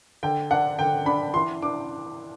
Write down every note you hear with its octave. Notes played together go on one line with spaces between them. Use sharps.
D3 G5
D4 F#5
D3 G5
D4 B5
E3 C6
D4 D6